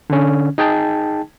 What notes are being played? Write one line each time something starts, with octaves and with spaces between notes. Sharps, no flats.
D3 C#4
D#4 G#4 G5 A5